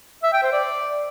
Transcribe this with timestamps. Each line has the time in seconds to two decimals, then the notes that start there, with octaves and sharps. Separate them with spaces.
0.23 E5
0.33 G5
0.43 C5
0.53 D5